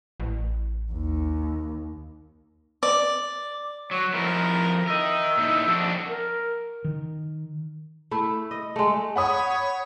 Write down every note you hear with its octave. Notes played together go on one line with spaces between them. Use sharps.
A1
D#2
D5
F#3 C#5
F2 F3 E4 A#4
A#4 D#5 E5
A#2 D#4 E4
F2 D4 F#4
A#4
D#3
A3 E4
D#5
G#3 A3
C#5 F#5 B5 D#6